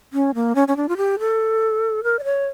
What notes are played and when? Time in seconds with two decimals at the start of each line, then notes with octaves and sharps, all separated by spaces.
0.13 C#4
0.35 A#3
0.55 C#4
0.68 C#4
0.77 D4
0.89 F4
0.97 G4
1.19 A4
2.04 A#4
2.19 D5
2.24 C#5